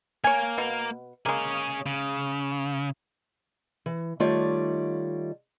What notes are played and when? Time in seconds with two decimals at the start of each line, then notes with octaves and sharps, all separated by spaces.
0.24 A#3 A#4 C#5 G#5
0.58 B2
1.26 G#3 A#3 C#4 G#4
1.86 C#3
3.86 E3
4.20 D#3 G3 A3 F4 C#5 D5